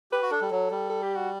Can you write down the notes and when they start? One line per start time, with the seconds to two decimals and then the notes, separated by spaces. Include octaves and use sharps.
0.12 G4 B4
0.22 F#4
0.31 D4 A4
0.41 G3
0.51 F#3
0.71 G3
0.90 A4
1.02 G4
1.16 F#4